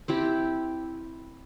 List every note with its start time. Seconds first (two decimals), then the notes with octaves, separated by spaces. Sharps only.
0.08 C4 E4 G4